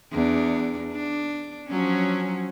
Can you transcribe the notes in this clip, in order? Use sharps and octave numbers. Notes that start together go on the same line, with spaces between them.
E2 D4
D4
F3 F#3 C#4